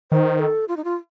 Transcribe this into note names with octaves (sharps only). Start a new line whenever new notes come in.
D#3 C5
A4
F4
D#4
F4